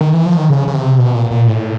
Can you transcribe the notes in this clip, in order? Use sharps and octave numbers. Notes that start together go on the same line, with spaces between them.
D#3
E3
F3
D#3
C#3
C#3
C3
B2
A#2
A#2
A2